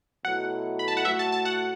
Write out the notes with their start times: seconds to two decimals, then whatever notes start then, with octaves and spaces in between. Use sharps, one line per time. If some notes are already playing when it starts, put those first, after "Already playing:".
0.25 B2 F#3 A3 E4 F#5
0.79 B5
0.88 A5
0.97 F#5
1.05 A2 A3 F#4 E5
1.19 A5
1.32 A5
1.45 F#5